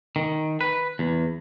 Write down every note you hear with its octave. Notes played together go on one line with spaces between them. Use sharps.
D#3
B4
E2